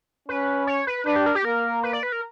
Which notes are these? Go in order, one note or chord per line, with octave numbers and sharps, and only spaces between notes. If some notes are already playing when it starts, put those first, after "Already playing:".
C#4 B4
C#5
B4
D4 B4
G4
A#4
G4
A#3 A#4
B4
D5
B4
A#4